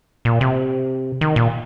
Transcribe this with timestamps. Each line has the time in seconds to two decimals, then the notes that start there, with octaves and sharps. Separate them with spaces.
0.25 A#2
0.41 C3
1.21 D#3
1.36 A#2